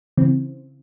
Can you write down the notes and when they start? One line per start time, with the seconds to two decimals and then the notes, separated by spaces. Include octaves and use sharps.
0.17 C#3 E3 C4